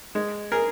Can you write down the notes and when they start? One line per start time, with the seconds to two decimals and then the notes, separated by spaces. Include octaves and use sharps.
0.15 G#3
0.52 G#4 A#4